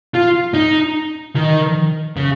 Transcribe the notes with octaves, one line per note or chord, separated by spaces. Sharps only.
F4
D#4
D#3
C#3